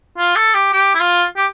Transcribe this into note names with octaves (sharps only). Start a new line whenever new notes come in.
F4
A4
G4
G4
E4
F4
G4